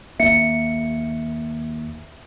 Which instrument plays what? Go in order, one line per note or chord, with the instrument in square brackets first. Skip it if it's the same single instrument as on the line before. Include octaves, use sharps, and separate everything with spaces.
[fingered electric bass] D#2 A#3 [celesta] E5 C#7